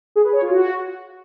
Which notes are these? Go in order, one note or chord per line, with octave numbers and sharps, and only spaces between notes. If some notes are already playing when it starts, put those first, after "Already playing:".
G#4
B4
C#5
F4
F#4